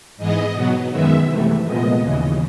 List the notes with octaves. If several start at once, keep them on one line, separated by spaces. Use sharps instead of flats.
G#2 E3 G#3 B3 D#5
B2 F#3 B3
F#2 D#3 G#3 B3 E5
C3 E3 A3
A#2 F3 G#3 B3 D#5
D#2 C#3 E3